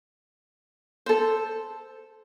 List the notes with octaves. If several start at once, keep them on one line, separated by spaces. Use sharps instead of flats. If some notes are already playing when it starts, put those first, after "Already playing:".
A4 C5